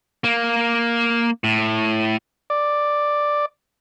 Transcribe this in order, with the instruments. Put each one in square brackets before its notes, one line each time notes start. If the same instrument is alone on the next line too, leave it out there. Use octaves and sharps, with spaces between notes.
[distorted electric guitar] A#3
A2
[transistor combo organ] D5